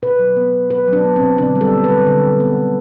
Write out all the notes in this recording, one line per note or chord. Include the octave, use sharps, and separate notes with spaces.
B2 B4
F#3
B3
B2
B2 B4
F#3
D4
B3
C4
B2
D3 D4
G3
A4
B3
B4
D3
D3
G3
B3
D3